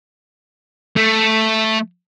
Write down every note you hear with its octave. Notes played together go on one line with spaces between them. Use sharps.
A3